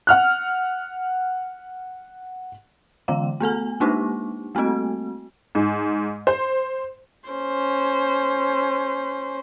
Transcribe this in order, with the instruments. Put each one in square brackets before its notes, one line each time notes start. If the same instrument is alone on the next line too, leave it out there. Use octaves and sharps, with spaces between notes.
[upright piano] F#5 F6 F#6
[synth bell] D3 E3 G#3 F5
A3 B3 A4 G#5
G#3 A#3 D4 D#4 G4
G3 A3 A#3 C4 F#4
[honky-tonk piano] G#2
C5
[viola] C#4 C5